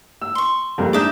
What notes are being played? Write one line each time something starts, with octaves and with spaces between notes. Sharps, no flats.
E6
C6 C#6
F2 G3 A#3
G#3 D4 D#4 E5 D6 D#6